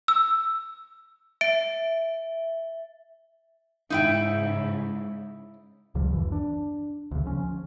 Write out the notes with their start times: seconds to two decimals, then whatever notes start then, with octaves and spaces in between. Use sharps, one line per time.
0.08 E6
1.41 E5 D7
3.90 G#2 C#3 D#4 E4 G5
5.95 C#2 C#3 F3 G3
6.11 D1 F#2 E3
6.32 D4
7.11 D2 C#3
7.26 F3 C#4